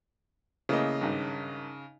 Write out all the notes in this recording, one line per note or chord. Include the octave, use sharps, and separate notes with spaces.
C#3 E3 A3 A#3 D#5
G#1 G2